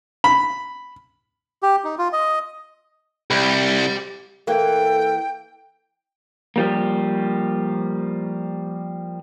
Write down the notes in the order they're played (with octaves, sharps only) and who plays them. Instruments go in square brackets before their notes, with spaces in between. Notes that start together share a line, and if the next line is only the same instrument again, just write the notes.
[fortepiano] B5
[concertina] G4
D#4
F4
D#5
[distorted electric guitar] C2 [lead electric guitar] G4 B5
[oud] E3 A#3 [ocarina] A4 [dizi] G5
[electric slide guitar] F3 G3 A#3